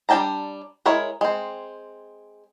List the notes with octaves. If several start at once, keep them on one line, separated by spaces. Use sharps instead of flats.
G3 D4 G5 A5 A#5
G#3 E4 A#4 C#5
G#3 C4